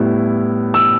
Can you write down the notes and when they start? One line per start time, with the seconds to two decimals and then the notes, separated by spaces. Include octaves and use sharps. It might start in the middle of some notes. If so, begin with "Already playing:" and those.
Already playing: A2 G3 B3 E4
0.74 E6